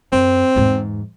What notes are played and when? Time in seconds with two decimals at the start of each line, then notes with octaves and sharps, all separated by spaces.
0.12 F#2 C4
0.56 E2 G#2